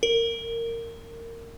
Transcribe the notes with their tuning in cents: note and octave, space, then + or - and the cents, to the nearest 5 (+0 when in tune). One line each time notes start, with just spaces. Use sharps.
A#4 -20